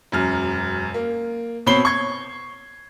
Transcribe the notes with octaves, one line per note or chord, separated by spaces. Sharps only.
E1 F#2 F6
A#3
B2 C4 C#5 B5 C7 G7
C#6 G#6